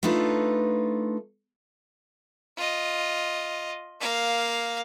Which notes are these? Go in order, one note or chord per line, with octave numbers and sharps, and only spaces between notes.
A3 D4 D#4 F4 A4 B4
F4 D#5
A#3 F5